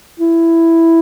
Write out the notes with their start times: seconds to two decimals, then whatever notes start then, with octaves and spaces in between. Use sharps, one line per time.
0.20 E4